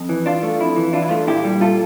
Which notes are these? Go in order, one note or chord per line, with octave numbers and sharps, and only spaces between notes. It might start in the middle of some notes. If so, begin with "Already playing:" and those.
Already playing: F2
E3
D4 F4
A3
F2 E4
E3
D4 F4
E4
A3 F4
A#2 E4 G4
G3
A#2 F4 A4